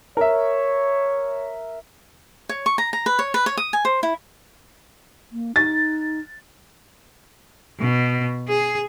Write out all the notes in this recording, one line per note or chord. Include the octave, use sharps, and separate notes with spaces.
A#4 C#5 E5
C#5
C#6
A#5
A#5
B4
C#5
B4
C#5
D#6
G#5
C5
E4
A#3
D#4 A6
B2
G#4